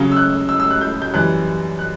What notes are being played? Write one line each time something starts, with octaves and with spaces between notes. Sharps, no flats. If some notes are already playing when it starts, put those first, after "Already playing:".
Already playing: C#3 F#3 C#4
E6
F#6
E6
E6
F#6
G6
G6
F#2 E3 G3 F#6
F#6